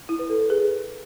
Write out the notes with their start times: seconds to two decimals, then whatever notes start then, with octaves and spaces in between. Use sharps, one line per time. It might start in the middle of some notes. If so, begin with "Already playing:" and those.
0.09 E4
0.19 B4
0.30 A4
0.40 B4
0.50 G#4